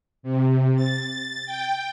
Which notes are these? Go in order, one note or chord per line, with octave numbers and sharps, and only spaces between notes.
C3
A6
G5